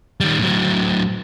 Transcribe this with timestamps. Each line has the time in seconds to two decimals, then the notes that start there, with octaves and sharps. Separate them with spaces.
0.20 D#3 G3
0.38 A2 F#3